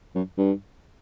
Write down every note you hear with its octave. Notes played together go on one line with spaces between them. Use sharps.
F#2
G2